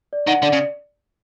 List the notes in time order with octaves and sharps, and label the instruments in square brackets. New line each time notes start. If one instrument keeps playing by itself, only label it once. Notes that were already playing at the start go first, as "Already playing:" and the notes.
[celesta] D5
[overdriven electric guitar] D#3 [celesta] F#5
[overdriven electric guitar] D3 [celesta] D5
[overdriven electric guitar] C#3